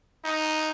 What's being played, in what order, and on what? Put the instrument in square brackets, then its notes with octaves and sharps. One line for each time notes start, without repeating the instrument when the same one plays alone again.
[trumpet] D#4